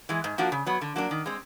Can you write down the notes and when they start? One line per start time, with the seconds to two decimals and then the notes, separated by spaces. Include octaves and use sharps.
0.09 E3 G#3
0.24 G#2
0.38 F3 A#3 D4 F#4
0.52 C#3
0.66 F#3 B3
0.81 D3
0.96 F#3 A#3 D4
1.11 D#3
1.26 G#3 C4